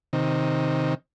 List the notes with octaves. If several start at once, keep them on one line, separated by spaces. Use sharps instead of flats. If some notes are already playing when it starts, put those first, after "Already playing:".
C3 D#3